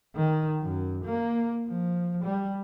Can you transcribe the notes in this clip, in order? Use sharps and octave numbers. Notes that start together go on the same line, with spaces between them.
D#3
F#2
A#3
F3
G3